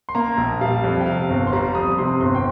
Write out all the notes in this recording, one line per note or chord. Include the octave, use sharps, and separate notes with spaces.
C6
A#3 A#5
A#1
G3 F5
F2
G5
C3 F5
G1
C6
G3 A#5
F2 D#6
D#6
C3 C6
G1 C6
G5